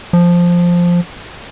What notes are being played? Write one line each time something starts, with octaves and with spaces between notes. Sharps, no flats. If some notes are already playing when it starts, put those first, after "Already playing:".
F3